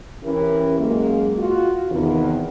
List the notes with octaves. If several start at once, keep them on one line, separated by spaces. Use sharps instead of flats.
E3 C#4 E4 G4 A#4
F#2 G#3 A#3
F4 F#4
E2 C3 D#3